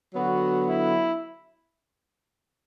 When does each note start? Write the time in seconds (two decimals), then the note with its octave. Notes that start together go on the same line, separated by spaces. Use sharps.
0.15 D3 F#3 B3 F#4
0.66 E4